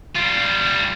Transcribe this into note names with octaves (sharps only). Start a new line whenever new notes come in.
G3 F4